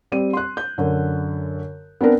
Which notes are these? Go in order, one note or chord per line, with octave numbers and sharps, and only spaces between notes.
G3 C4 D5 D#7
C6 F#6
G6
F#2 D3
B3 C4 D4 A#4